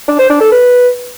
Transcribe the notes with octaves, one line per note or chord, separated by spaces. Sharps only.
D4
C5
D4
A4
B4